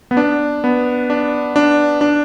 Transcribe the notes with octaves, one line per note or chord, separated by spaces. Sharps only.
B3
D4
B3
D4
D4
D4